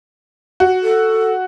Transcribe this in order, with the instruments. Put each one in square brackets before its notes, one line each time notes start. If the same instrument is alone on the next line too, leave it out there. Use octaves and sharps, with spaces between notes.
[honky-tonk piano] F#4
[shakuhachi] A4